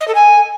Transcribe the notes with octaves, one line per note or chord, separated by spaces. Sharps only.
D#5
A4
G#5